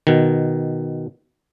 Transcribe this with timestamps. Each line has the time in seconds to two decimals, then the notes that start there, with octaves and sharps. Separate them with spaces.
0.07 B2 D#3